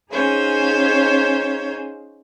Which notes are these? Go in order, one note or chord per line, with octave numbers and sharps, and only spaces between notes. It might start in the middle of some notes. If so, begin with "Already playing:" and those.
C#4 D#4 G#4 C5 C#5 F5